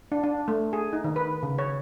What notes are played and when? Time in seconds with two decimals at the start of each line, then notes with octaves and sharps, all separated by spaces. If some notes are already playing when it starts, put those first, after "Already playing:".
0.12 D4
0.24 D4
0.48 A3
0.73 G#4
0.93 D#4
1.04 D#3
1.16 B4
1.43 C#3
1.59 C#5